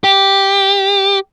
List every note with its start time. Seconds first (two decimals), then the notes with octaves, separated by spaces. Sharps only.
0.04 G4